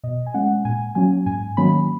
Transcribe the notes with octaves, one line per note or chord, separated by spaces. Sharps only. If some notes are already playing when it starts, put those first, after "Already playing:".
B2 D#5
G#5
G#3 C#4 F#5
A#2 G#5
F#3 A#3 C#4 G#5
G#2 G#5
D#3 F#3 A#3 C#4 B5